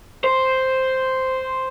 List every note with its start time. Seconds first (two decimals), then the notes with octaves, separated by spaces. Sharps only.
0.24 C5